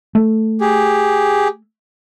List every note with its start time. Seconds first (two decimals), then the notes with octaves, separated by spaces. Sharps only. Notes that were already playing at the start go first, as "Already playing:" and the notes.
0.15 A3
0.61 G4 G#4